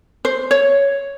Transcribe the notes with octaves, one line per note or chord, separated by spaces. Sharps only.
C5
C#5